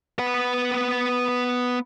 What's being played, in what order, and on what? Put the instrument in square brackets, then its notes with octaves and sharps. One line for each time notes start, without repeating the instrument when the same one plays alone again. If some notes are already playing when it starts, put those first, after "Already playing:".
[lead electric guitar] B3 F#5